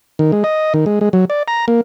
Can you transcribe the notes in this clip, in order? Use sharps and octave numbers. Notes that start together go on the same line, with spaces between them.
D#3
G#3
D#5
D#3
G#3
G#3
F#3
D5
A#5
A#3